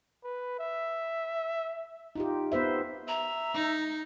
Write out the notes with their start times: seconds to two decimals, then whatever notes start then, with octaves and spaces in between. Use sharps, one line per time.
0.24 B4
0.59 E5
2.15 D#4 F4 G4
2.52 B3 B4 C5 E5
3.08 E5 A#5
3.54 D#4